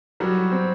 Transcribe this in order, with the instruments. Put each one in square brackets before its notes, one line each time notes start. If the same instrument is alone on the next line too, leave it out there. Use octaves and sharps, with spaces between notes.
[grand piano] F#3 F#4 [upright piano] G3
[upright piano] C4